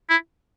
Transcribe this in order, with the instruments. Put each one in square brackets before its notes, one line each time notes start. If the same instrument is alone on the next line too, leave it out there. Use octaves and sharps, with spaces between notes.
[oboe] E4